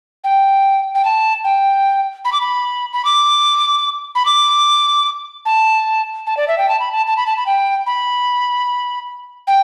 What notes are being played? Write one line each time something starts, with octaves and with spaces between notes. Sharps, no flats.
G5
G5
A5
G5
B5
D6
B5
B5
D6
B5
D6
A5
A5
D5
E5
G5
A5
B5
A5
A5
B5
A5
B5
G5
B5
G5